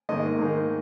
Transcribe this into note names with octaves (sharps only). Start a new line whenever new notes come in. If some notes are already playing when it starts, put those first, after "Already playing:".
G#2 D#3 A#3 D#5
G#2 D#3 A#3